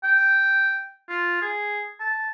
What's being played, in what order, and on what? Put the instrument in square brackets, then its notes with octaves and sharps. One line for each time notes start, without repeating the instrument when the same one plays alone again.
[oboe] G5
F4
G#4
A5